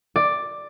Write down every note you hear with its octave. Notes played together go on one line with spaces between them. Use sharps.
D5